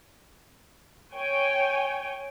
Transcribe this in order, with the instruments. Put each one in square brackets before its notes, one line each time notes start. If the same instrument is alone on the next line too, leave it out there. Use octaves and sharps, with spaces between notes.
[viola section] C#5 G5 G#5